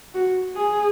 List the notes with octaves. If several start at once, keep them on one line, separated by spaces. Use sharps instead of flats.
F#4
G#4